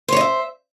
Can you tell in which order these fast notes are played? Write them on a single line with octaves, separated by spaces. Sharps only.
C5 C#5 D#5 E5